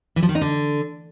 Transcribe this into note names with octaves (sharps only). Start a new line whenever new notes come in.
E3
F3
D#3
D#4
D3